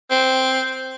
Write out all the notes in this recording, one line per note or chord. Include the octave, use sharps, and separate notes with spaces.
C4